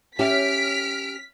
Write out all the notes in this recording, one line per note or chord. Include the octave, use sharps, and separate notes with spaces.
C#4 G4 C#5 E5 G5 F6 B6 D7